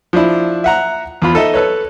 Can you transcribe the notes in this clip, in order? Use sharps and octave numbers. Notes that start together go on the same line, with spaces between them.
F3 D4 E4
E5 F#5 A#5
E2 F4 B5
D#4 A4 D#5 E5
A4 B4 C#5